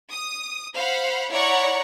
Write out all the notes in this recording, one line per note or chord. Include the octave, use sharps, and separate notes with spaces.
D#6
C5 F5 F#5 B5
E4 C#5 D5 F#5 A#5 C#6